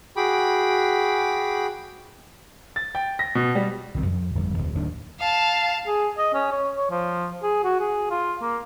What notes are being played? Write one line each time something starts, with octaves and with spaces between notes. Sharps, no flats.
F#4 G#4 G5 B5 D6
A6
G5
A#6
B2
G3
C2 D#3 C4
F2
G1 F2
D1 G1
D1 D#2 D#3 D4
F5 A5
G#4
D#5
C#4
C#5
C#5
F3
G#4
F#4
G#4
F4
A#3